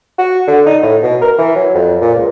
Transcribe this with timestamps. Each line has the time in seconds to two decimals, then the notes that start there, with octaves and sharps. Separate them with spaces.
0.18 F#4
0.48 D3
0.66 D#4
0.83 A2
1.03 B2
1.22 A#4
1.38 E3
1.55 F#3
1.74 F2
2.01 A#2
2.15 C#2